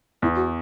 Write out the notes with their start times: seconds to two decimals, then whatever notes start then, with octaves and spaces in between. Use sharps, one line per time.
0.22 E2 E4
0.36 F#4